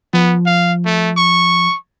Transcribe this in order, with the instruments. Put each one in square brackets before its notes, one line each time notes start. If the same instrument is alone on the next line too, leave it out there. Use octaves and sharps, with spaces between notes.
[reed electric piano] F3 [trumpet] B3
[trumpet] F5
A3
C#6